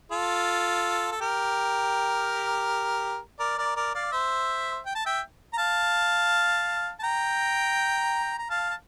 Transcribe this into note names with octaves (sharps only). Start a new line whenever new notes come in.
F4 A4
A4
G4 A#4
A#4 D5
A#4 D5
A#4 D5
D5 F5
C5 E5
G5
A5
E5 G5
A#5
F5 A5
A5
G5 A#5
A#5
F5 A5
A5